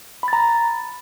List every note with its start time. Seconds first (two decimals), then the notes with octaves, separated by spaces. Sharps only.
0.23 B5
0.28 A6
0.33 A#5